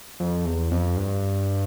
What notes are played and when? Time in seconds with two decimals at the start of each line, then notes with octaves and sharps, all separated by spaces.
0.20 F2
0.45 E2
0.71 F2
0.97 G2